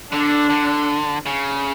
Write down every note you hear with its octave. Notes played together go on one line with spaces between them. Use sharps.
D3 D4
D3
C#3